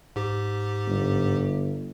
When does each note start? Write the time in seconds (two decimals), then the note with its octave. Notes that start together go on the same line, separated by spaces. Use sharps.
0.16 G#2 G4
0.87 G1